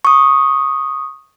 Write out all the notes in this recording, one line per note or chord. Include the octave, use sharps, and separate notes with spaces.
C#6 D#6